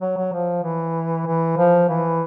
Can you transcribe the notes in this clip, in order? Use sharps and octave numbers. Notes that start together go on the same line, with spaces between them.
F#3
F#3
F3
E3
E3
F3
E3